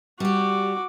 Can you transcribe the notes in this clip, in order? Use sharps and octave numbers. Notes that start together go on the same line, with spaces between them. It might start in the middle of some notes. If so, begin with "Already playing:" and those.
G3 F#4 G4 D6